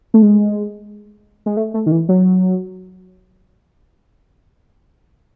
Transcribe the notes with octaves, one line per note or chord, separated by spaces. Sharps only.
A3
G#3
G#3
A3
A3
D#3
E3
F#3